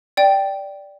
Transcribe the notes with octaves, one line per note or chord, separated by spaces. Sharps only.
D5 G5